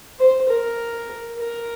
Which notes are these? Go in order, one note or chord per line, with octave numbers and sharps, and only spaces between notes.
C5
A#4
A#4